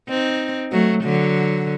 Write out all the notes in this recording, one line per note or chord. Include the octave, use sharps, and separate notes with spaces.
C4 D#4
F#3 A3
D3 F#3